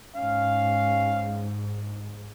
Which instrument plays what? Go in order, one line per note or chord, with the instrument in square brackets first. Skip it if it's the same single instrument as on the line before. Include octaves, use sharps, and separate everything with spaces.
[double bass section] G#2 [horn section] C#4 F5